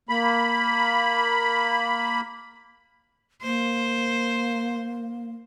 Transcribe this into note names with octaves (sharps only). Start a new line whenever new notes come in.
A#3 B5
A#3 C5